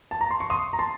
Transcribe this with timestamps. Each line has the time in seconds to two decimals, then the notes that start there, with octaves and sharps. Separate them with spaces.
0.11 A5
0.21 A#5
0.31 C6
0.40 C#6
0.50 C6 D#6
0.73 A#5
0.79 A5 C6